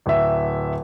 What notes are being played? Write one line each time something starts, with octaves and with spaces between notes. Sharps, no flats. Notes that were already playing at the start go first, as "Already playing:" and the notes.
D1 E5